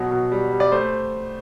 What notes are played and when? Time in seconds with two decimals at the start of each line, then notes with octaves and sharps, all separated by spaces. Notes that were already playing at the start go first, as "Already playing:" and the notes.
Already playing: B2 F#3
0.11 B2
0.32 G3
0.52 G3
0.60 D5
0.72 A3 C5